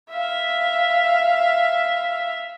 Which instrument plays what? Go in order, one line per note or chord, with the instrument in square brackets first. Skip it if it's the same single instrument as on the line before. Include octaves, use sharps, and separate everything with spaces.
[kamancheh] E5 F5